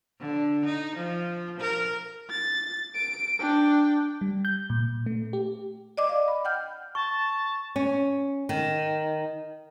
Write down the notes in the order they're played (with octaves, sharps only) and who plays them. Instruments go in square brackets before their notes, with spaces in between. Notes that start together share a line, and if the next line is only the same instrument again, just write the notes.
[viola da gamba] D3
D#4
F3
A#4
[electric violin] A6
D7
D4 G5
[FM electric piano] G3
G6
A#2
A3
G4
[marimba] D5 D#5 D6
F5
B5
F#5 G5 F6 G6
[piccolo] A5 [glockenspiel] C#6
[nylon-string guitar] C#4
D#3